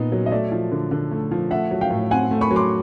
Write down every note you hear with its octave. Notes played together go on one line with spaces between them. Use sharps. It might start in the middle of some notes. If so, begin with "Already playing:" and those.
Already playing: A#2 B3 D#4
F#3
D#5
A3 D5 E5
F3
D3
D3
A3
F3
A3 E5 F#5
F#3
F5 G5
A2
C4 F#5 G#5
A3
B5 C#6
F#3
C6 D6